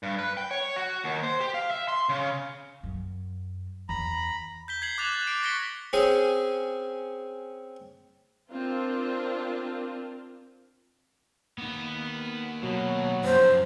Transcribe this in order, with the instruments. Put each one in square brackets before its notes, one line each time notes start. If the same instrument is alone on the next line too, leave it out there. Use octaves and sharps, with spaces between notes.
[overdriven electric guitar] G2
B4
G5
C#5
F#4
D#2
C5
G4
F5
E5
C6
C#3
[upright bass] F#2
[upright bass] E2 [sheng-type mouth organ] A#5 B5
[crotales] G6 B6 G7
G#6 C7 F#7
D6 F#6 A6 F7
F#6 A6
C7 D7
C#6 A#6 B6 C#7 D7 G7
[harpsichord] C4 C#4 G#4
[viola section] C4 D4 F4 A#4
[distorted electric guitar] A#3 D#4 [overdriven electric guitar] B3
[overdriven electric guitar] B2 [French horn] F#3
[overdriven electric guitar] F#2 F3 [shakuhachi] C5